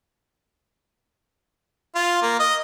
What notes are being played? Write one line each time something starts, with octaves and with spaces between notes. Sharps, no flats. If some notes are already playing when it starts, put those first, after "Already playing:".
F4
A#3
D#5